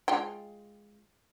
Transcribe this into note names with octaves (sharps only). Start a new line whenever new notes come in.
G#3 F4 G5